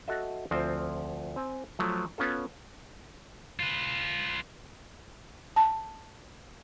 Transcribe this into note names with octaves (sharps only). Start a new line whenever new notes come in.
F#4 A4 D#5 E5
D2 F3 C4 C5
C4 G#5
F3 F#3 A3
B3 C#4 F4 A4
F4 B4
A5